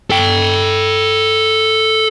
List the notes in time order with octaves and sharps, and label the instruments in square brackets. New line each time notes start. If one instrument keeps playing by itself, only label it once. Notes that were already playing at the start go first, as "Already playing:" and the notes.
[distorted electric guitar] A4 G5